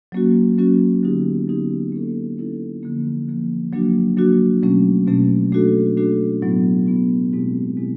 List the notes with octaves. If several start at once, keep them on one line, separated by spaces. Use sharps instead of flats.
F#3 A#3 C#4 F#4
F#3 A#3 C#4 F#4
D3 F#3 B3 D#4 G4
D3 F#3 B3 D#4 G4
A#3 C#4 E4 A4
A#3 C#4 E4 A4
D3 F3 A#3
D3 F3 A#3
F#3 A#3 D4 F#4
F#3 A#3 D4 F#4
B2 F#3 A3 C#4
B2 F#3 A3 C#4
A3 D4 F#4 A4
A3 D4 F#4 A4
A2 F#3 B3 E4
A2 F#3 B3 E4
B2 G#3 C4 E4 G4
B2 G#3 C4 E4 G4